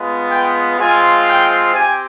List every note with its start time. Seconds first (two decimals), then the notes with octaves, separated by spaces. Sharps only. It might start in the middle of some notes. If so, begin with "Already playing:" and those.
Already playing: G#3 B3 F4
0.29 G5
0.78 G#3 C4 F4 G#5
1.26 G5
1.75 C4 G4 G#5